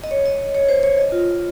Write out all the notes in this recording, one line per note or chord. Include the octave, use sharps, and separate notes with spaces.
D#5
C#5
D#5
C#5
C5
C#5
D#5
F4